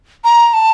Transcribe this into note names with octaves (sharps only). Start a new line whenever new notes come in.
A#5
A5